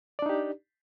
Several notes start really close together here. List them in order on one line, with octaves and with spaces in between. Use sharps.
D5 D4 D#4 G4